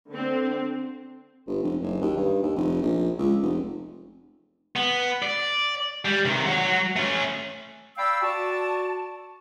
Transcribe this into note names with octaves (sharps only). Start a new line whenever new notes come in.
D3 C4
G1
F1
F#1
D#2
G2
D#2
F1
A#1
C#2
F1
B3
D5
G3
C3 D#3
F#3 F#5
A3 C#4
D5 F5 G5 B5 E6
F#4 D5 A5